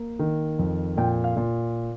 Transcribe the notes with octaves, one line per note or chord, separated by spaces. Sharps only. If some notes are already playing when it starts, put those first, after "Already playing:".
Already playing: A#3
D#3
F2
A#2 G5
F5
A#2